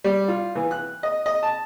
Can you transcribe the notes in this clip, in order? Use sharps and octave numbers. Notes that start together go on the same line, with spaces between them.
G3
F4
E3
F#6
D#5
D#5
A5